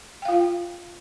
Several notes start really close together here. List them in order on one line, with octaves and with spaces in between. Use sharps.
G5 F5 F4